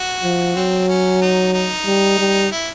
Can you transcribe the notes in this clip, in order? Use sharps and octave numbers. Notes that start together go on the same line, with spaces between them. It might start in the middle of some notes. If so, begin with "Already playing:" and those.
Already playing: F#4
F3
F#3 C4
C#4
D#4
D#4
G3
G3
E4